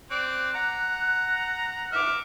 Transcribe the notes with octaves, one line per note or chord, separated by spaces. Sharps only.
C4 D5 F#6
F#5 A#5
E5 D6 F6